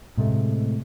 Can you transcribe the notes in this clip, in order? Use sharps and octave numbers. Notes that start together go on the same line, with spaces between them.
A2 C3 G#3 A3